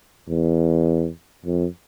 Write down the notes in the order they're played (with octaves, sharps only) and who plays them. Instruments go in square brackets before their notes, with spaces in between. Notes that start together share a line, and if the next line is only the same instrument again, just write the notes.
[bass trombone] E2
F2